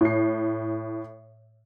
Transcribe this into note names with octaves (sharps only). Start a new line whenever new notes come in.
A2 C7